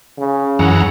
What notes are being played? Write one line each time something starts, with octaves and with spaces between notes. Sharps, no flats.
C#3
F#2 E3 F#3 G#4 F#5 A#5